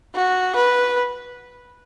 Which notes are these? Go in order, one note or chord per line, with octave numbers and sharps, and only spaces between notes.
F#4
B4